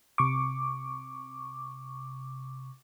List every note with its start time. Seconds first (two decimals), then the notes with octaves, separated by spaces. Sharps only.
0.18 C3 C#6 D6